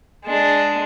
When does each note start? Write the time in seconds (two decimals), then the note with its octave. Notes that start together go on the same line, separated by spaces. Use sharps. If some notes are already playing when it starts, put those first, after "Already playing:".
0.24 G#3 D4